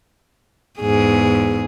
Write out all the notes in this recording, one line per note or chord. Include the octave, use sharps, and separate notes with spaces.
E2 G#2 G#4